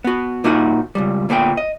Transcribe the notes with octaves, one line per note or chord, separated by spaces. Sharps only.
B3 F#4
A#2 A#3 D#4 F#4 F#5
C#2 C3 G3
D2 A#2 B3 G#4 G5
D#5